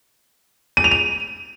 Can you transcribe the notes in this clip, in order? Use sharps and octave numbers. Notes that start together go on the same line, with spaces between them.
D#7
F7
D#7